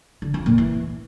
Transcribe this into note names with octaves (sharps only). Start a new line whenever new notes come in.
D3
F2
A#2
E3